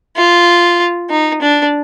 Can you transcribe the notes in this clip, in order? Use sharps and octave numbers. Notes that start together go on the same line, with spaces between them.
F4
D#4
D4